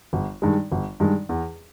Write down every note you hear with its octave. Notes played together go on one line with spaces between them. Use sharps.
G1
G2 D#3 G#3
G1
G2 D#3 G#3
E2